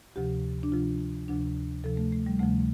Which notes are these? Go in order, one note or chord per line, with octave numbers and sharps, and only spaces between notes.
D2 C3 F3 G4
D4
D2 C3 F3 F4
D2 C3 F3 D4
D2 C3 F3 A4
A3
A3
G3
D2 C3 F3 A3